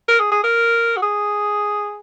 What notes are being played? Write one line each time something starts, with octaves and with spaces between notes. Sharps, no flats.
A#4
G#4
G#4
A#4
F#4
G#4